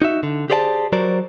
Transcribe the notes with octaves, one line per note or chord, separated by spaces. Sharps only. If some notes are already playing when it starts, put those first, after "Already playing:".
D#4 F#4 E5
D3
G4 G#4 C5 D5 G5 A5
F#3 F#4 A#4 C5 D5